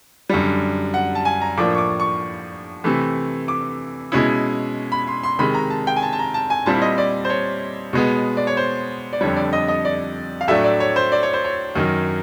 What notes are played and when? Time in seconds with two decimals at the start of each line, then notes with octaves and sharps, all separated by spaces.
0.30 F#2 D3 G3
0.94 F#5
1.15 A5
1.25 G#5
1.41 A#5
1.57 A2 F3 A#3 D4 D6
1.75 C#6
1.78 D6
2.00 C#6
2.84 C3 E3 A3
3.48 D6
4.12 B2 G#3 C#4 E4
4.92 B5
5.07 C6
5.23 C6
5.39 C3 D#3 G#3 B5
5.55 A#5
5.70 A5
5.87 G5
5.96 G#5
6.02 A5
6.13 A5
6.19 A#5
6.34 A5
6.50 G#5
6.66 A#2 G3 C4 E4 A5
6.82 D#5
6.98 D5
7.25 C5
7.30 C#5
7.93 B2 G#3 B3
8.37 D5
8.47 C#5
8.57 C5
9.13 D5
9.21 F2 D3 G3 C#5
9.37 D5
9.53 D#5
9.68 D#5
9.85 D5
10.41 F5
10.48 A2 F#3 A3 D4 E5
10.64 D5
10.80 C#5
10.96 C5
11.12 D5
11.23 C#5
11.34 C5
11.44 C#5
11.76 F#2 D#3 F#3